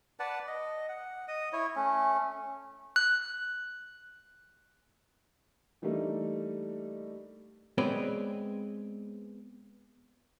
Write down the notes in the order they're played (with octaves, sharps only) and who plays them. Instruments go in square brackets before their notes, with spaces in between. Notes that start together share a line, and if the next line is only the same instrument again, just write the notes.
[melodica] B4 D5 F#5 A5
D#5
F#5
D#5 D#6
E4 C#5
A3 C#4
[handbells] F#6
[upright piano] E3 G3 A3 A#3 D4 D#4
[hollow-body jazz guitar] G#3 B3 C4 B4 C#5 D5